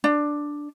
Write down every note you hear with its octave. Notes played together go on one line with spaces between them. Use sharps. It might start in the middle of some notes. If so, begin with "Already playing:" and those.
D4